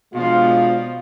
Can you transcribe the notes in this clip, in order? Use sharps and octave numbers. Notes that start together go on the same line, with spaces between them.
B2 F3 G#3 D4 F4